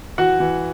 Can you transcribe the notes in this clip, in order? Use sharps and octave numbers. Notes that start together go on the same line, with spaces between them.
E3 F#4 F#5
E3